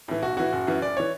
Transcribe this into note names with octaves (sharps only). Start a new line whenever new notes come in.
A2 E3
B1 F#4
A2 E3 F#4
F#1
F#2 E3
F#1 D5
E3 C#5